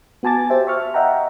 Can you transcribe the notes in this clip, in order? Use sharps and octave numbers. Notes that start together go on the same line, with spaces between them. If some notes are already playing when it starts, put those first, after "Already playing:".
B3 F#4 G#5 A5 D6 A6
G4 C5 E5 G5
E5 C#6 F6
D#5 E5 F#5 G5 A#5